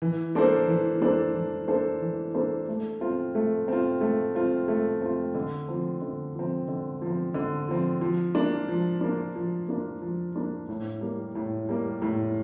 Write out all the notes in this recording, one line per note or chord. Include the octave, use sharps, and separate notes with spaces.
E3
A#3 D4 A4 C5
E3
A#3 D4 A4 C5
E3
A#3 D4 A4 C5
E3
A#3 D4 A4 C5
A3
C4 F4
A3
C4 F4
A3
C4 F4
A3
C4 F4
D3
F3 C4
D3
F3 C4
D3
F3 C4
D3
F3 C4
F3
A#3 D4
F3
A#3 D4
F3
A#3 D4
F3
A#3 D4
A2
G3 A#3
A2
G3 A#3
A2